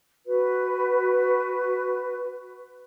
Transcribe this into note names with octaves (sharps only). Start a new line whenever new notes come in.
F#4 B4